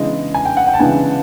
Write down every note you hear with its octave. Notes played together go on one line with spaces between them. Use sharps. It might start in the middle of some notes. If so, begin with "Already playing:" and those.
Already playing: C#3 E3 G#3 B3 D4 D#5
G#5
G5
F#5
G5
A5
C#3 E3 G#3 B3 D4 G#5